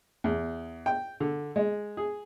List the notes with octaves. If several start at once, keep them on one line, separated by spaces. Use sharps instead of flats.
E2
G5
D3
G#3
G#4